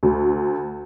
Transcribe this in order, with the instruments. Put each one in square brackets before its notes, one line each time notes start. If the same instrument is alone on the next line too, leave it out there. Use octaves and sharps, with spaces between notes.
[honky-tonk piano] D2